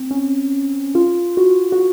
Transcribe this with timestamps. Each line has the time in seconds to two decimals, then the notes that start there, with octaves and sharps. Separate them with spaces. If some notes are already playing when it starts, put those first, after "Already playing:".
Already playing: C4
0.11 C#4
0.95 F4
1.37 F#4
1.72 F#4